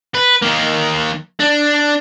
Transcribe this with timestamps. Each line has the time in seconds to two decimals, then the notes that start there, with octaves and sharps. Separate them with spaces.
0.15 B4
0.42 D#3 A#3
1.40 D4